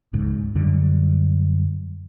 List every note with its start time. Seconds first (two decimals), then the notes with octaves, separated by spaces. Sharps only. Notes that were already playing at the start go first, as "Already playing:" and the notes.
0.13 D1 C#2 G#2
0.55 F#2 D3 G3